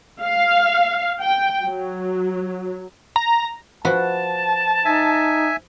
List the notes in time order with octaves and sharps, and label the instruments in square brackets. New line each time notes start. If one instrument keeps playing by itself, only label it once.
[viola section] F5
G5
F#3
[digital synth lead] A#5
[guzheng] F3 F#4 B4 [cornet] A5
[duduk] D#4 [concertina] E5 G#5